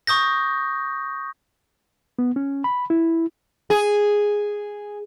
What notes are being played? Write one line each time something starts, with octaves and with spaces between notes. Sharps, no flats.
C#6 D#6 G6 A#6
B3
C#4
B5
E4
G#4